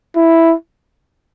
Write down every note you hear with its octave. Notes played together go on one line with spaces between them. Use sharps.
E4